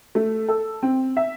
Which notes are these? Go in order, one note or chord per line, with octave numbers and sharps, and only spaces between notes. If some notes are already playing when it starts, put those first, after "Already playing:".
A3
A4
C4
E5